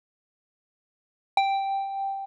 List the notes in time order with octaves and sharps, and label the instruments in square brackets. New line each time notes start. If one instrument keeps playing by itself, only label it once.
[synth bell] G5